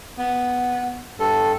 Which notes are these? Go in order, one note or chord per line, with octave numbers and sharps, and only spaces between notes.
B3
G2 A4